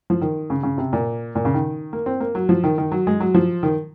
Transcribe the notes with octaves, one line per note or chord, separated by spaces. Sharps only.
F3
D#3
C#3
C#3
C3
A#2
A#2
C#3
D#3
A#3
C4
A#3
F#3
F3
D#3
D#3
F#3
G#3
F#3
F3
D#3